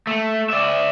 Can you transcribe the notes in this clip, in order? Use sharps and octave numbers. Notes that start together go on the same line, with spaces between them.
A3
D5 E5